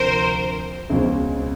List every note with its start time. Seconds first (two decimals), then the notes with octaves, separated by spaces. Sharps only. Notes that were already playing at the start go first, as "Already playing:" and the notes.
Already playing: D2 C3 F3 A#4 C5
0.90 C#2 B2 G#3 C4